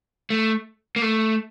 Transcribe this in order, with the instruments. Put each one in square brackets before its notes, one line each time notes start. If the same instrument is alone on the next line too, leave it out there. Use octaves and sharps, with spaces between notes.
[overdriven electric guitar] A3
A#3
A3